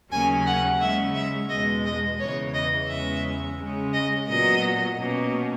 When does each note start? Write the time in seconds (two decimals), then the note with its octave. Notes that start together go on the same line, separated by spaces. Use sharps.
0.11 D#2 C#3 F#3 A#3 C#4 G#5
0.47 F#5
0.81 C#3 G#3 C#4 E5
1.15 E5
1.50 E2 B2 G#3 D#5
1.85 D#5
2.20 E2 C#3 E3 C#5
2.54 D#5
2.89 E2 C#3 G#3 C#4 E5
3.59 C#3 G#3 C#4
3.93 D#5
4.28 A#2 F#3 B3 D#5
4.97 B2 A#3 C#4